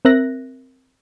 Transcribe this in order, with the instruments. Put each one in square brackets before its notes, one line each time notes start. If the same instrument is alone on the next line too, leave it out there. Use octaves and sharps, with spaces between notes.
[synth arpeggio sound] C4 A#4 E5 F#6 A#6